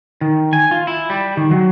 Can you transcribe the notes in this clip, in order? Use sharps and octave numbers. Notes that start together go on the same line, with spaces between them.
D#3
G#5
F4
E4
G3
D#3
F#3